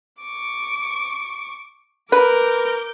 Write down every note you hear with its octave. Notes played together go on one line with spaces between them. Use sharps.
C#6 D6
A#4 B4 D6 G6